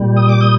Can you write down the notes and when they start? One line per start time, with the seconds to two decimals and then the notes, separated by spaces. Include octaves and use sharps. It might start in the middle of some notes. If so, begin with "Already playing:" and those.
Already playing: A#2 G3
0.17 D#6
0.29 D6
0.41 D#6